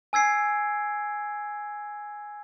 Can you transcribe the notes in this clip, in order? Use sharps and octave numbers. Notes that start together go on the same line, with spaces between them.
G#5 E6 G#6 C7 D7